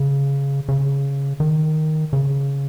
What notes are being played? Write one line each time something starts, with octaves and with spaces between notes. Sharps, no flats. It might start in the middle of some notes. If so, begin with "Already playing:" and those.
Already playing: C#3
C#3
D#3
C#3